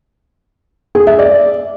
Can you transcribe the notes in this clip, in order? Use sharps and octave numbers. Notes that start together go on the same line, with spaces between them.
G#4
E5
D5